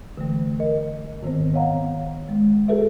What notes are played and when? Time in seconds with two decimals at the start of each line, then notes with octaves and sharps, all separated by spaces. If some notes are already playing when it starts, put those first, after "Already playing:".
0.17 D3 E3 A3
0.59 A#4 D#5
1.23 G#2 D#3 B3 C4 C5
1.53 B3 C#5 D#5 F5 F#5 A#5
2.29 G#3
2.68 F#4 G#4 A4 B4 E5